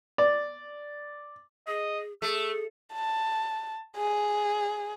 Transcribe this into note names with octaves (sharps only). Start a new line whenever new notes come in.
D5
G#4 D#5
A3 G#4 E6
A5
G#4